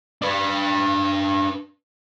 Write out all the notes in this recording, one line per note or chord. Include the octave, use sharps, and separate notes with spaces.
D4 B4